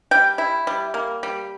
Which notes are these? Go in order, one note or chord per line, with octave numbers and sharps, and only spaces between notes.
G3 G5
E4
G3
A#3
G3